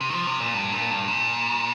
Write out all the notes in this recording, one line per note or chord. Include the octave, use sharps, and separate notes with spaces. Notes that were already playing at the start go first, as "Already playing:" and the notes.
C3
D#3
F3
C3
A#2
G2
A#2
G2
A#2